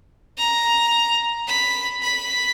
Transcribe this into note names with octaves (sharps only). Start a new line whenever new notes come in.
A#5
B5
B5